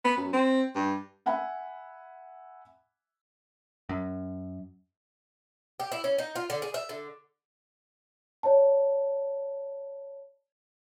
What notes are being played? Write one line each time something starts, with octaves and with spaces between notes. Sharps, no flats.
B3
F#2
C4
G2
E5 F#5 G#5 B5
F#2
G4
E4
C#4
D#4
F4
D3
G#4
E5
D3
C#5 D5 A5